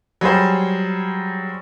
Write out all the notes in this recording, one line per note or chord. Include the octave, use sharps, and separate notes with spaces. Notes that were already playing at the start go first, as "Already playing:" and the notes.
F#3 G3 G#4 C5